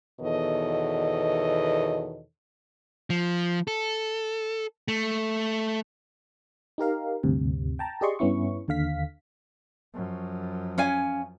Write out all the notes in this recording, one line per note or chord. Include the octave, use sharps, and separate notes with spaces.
E2 B2 D#3 A4 C#5 D#5
F3
A4
A3
D#4 G4 A#4 F5
D2 G2 C3
G5 A5 A#5
G4 G#4 D5 D#5 C6 C#6
G2 B3 C#4 E4 C#6
D#2 D3 F5 B6
F#2 F3
C#4 F5 G#5